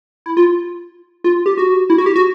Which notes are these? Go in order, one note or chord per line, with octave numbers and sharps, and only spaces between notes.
E4
F4
F4
G4
F#4
E4
F#4
G4
F#4